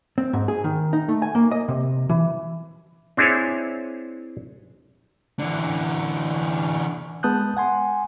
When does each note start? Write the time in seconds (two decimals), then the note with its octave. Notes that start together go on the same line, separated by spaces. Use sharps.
0.18 C4
0.33 G#2
0.48 G#4
0.64 D#3
0.93 D#4
1.08 A3
1.22 G#5
1.35 A#3
1.51 D#5
1.68 C3
2.09 E3
3.17 C4 D4 E4 G#4 C5 C#5
5.39 D3 E3
7.23 G#3 B3 A5 D#6 F#6 G6
7.57 F#5 G#5 C6